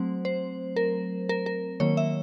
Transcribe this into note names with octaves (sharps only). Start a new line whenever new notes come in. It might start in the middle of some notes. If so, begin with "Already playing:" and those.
Already playing: F#3 A3 C4 C5
C5
A#4
A#4
A#4
D#3 F#3 A#3 C#5
E5